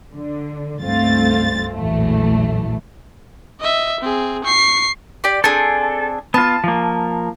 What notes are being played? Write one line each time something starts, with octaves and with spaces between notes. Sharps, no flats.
D3
C#2 G2 A3 C4 F4 A6
A#1 E2 A2 E3 F#3 A3
D#5 E5
C4 G#4
C#6 C7
G4 D5
C4 D4 G#4 A4
B3 F4 A5
F3 A#3